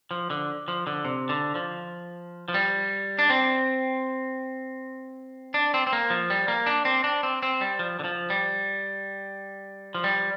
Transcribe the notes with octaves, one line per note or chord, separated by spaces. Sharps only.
F3
D3
F3
D3
C3
D3
F3
F3
G3
D4
C4
D4
C4
C4
A#3
F3
G3
A#3
D4
C4
D4
C4
C4
G3
F3
D3
F3
G3
F3
G3